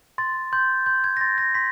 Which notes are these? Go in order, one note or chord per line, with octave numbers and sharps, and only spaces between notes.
C6 A6
C6 G6
C6 G6
G#6
A#6
C6 A6
A#6
C6 B6